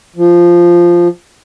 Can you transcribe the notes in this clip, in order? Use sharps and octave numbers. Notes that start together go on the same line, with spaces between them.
F3